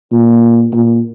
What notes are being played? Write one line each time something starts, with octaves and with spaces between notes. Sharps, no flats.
A#2
A#2